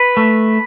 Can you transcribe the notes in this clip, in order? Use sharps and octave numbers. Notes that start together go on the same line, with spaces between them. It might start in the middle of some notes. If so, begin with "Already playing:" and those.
Already playing: B4
A3